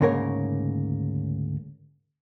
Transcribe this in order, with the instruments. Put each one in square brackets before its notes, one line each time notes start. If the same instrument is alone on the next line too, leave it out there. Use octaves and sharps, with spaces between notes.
[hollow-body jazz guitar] D2 G#2 C#3 A#3 A#4 C#5